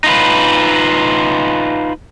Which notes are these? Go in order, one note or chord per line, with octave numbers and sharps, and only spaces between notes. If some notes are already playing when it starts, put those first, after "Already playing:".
D#4 F4 B4